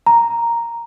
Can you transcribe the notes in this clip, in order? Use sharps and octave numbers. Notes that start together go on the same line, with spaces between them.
A#5